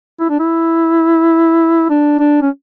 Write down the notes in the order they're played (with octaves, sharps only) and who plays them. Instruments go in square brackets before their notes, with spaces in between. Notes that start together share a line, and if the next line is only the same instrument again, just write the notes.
[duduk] E4
D4
E4
D4
D4
C#4